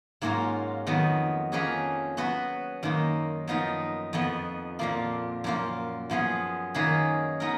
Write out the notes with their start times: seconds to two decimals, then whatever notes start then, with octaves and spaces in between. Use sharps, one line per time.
0.22 G#2 F#3 A#3 C#4 F4
0.87 F2 D#3 F#3 B3
1.52 F3 A#3 C#4 G#4 B4
2.17 F#3 B3 F#4 B4
2.83 F#2 D#3 A#3
3.48 F#2 F3 B3 D#4 A#4
4.13 F2 F3 B3
4.79 A#2 F3 A#3 F4
5.44 F#2 F3 A#3 F4
6.10 F#2 F3 B3 F4 G#4
6.74 D#3 A#3 C#4 G#4 B4
7.40 B3 D#4 A#4